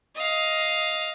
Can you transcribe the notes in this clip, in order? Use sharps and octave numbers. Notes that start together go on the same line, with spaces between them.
D#5 F5